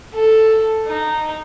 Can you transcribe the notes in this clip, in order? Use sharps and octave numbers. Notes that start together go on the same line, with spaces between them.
A4
D#4